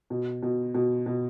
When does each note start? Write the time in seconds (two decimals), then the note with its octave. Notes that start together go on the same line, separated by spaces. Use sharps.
0.10 B2
0.43 B2
0.74 B2
1.06 B2